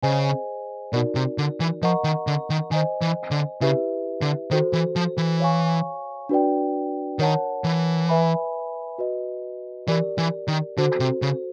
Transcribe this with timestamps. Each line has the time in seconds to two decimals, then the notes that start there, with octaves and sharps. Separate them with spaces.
0.03 C#3 G#4 C5 D#5 G#5
0.93 B2 D#4 F#4 A#4 D5
1.15 C3
1.38 D3
1.60 E3
1.82 F3 A#4 D#5 F#5 A#5 C#6
2.04 D#3
2.27 D3
2.50 D#3
2.71 D#3 C5 D#5 G#5
3.02 E3
3.31 D3
3.61 C#3 E4 G4 B4 E5
4.22 D3
4.51 D#3 F#4 A4 C5
4.73 E3
4.96 F3
5.18 E3
5.40 C#5 F5 G#5 C#6
6.29 D4 F#4 B4 D5 G5
7.19 D#3 A#4 C#5 F#5 A5
7.64 E3
8.09 B4 E5 G#5 B5
8.98 F#4 B4 D#5
9.88 E3 G4 A#4 D5
10.18 E3
10.48 D#3
10.78 D3 F#4 A4 C5
11.00 C3
11.22 C#3